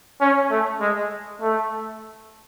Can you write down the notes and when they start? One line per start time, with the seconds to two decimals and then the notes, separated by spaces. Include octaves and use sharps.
0.20 C#4
0.50 A3
0.80 G#3
1.41 A3